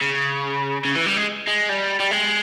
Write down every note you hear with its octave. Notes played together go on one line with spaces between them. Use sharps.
C#3
C#3
E3
G3
G#3
G#3
G3
G3
G#3